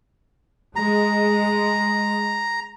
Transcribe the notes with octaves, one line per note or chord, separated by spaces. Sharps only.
G#3 A#5